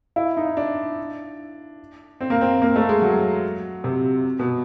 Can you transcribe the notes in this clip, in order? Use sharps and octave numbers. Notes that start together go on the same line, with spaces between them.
E4
D#4
D4
C4
A#3
C4
A#3
A3
G#3
F#3
C3
B2